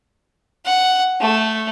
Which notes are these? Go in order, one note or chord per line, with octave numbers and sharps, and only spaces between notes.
F#5
A3